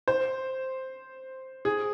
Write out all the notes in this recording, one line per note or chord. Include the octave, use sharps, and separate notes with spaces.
C5
G#4